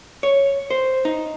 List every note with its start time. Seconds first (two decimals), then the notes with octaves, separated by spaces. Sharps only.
0.23 C#5
0.70 C5
1.05 D#4